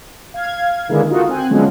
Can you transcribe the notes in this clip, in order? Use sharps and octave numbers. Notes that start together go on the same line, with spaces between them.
F5 G#6
D3 D#3 G#3 A#3 B3 E4
D#4 F4 F#4 A4 A#4
C4 G#5 F#6
D3 F3 F#3 G#3 B3 C#4